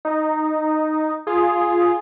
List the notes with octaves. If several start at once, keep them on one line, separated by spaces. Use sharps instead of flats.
D#4
F4 G#4